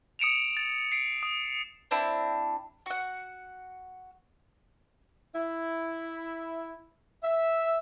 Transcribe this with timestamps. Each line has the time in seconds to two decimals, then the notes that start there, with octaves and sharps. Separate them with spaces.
0.19 D#6 C#7 D7 E7 F7
0.57 A6
0.92 C7 D7
1.23 D#6
1.91 C4 D4 E4
2.86 F#4 F#5
5.34 E4
7.23 E5